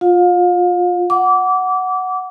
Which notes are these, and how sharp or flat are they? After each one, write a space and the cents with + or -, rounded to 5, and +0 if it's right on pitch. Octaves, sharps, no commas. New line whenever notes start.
F4 +20 F5 +35
F#5 +0 D6 -25